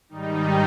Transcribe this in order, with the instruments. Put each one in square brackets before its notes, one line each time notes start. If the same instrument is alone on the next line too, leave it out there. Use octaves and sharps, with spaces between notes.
[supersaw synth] G#2 D#3 G3 D#4